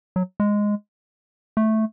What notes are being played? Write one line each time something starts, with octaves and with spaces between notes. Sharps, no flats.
F#3
G#3
A3